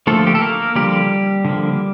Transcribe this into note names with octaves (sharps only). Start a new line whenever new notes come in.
D3 F3 A3 A#3 A4
G4
A4
A#3 A#4
D3 F3 G3 A#3 G4
D3 F3 A#3